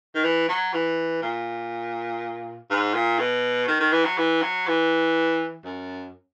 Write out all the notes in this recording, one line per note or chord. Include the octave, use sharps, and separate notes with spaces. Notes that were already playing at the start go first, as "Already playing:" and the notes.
D#3
E3
F#3
E3
A#2
G#2
A#2
B2
D#3
D#3
E3
F#3
E3
F#3
E3
F#2